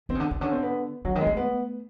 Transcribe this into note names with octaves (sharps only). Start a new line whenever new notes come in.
D#3 C4
C#3
D3
C#3
D3 C#4
C4
B3
D3 F#3
D#3
G#3
A3
B3